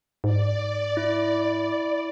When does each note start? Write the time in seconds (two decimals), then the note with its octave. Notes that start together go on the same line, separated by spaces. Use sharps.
0.24 G#2 D5
0.97 E4